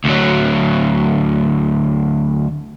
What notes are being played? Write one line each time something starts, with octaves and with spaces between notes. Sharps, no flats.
D2 F#3